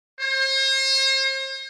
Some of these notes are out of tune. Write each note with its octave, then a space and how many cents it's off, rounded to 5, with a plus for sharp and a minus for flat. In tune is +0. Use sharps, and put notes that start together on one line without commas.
C5 +40